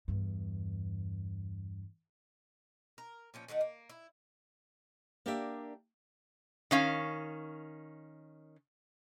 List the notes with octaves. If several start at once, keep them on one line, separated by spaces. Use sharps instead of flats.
E2 G2
A#4
A#2 F3 C#4
D#3 A3 D#4 F#5
A#3
E4
A#3 D4 G4 A#4 D5 E5
D#3 C#4 F5